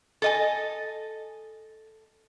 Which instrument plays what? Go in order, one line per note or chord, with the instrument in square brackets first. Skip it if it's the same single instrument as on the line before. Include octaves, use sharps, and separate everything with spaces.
[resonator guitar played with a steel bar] A4 D#5 G#5